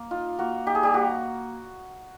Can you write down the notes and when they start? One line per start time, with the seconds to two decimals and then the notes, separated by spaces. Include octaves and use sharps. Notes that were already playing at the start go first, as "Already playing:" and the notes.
Already playing: A#3
0.11 D#4 F4
0.39 A#3 F#4
0.66 D#4 G4
0.75 G#4
0.83 G3 G4
0.94 A#3 F#4